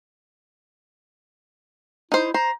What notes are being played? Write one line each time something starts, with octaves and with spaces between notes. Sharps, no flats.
D#4 E4 C5
C5 A#5